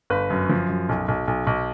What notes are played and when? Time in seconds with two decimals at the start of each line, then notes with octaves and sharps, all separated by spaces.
0.10 G1 B4
0.30 F#2
0.49 F3
0.69 F#2
0.89 B1
1.08 B1
1.27 B1
1.47 B1